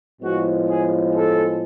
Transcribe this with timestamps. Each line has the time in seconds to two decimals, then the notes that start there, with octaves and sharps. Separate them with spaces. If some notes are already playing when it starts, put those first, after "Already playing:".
0.22 A2 F3 G#3 B3 F#4
0.68 G#4
1.15 A4